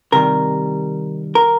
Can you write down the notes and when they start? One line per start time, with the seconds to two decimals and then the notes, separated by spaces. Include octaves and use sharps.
0.12 C3 D#3 G3 A#4
1.35 A#4